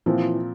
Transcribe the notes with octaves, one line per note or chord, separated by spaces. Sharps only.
A#2 E3 F3 C4